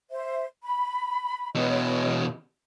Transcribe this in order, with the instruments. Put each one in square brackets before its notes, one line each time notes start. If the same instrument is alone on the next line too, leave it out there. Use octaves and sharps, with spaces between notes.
[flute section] C5 E5
B5
[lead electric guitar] E2 B2 [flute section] B4 C#5 D#5